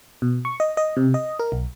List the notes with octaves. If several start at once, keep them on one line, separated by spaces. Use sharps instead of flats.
B2
C#6
D#5
D#5
C3
D#5
A#4
B1